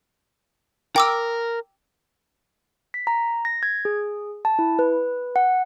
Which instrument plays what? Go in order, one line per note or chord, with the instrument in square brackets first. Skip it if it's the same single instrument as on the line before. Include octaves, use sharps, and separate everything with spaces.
[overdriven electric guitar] A#4 [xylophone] G5 D6 E6
[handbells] B6
A#5
A#6
G#6
G#4
A5
E4
B4
F#5